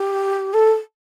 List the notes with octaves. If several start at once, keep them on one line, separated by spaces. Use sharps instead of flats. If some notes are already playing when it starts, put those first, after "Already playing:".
Already playing: G4
A4